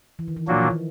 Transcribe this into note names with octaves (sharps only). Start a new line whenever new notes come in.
E3
D#3
E3
A#2 F3 F#3 A#3 D4 F#4
E3
D#3
E3